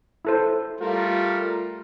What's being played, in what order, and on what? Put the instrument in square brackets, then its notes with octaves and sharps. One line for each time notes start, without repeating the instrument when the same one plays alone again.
[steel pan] E4 A4 C5
[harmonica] G3 A3 A#4 [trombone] F4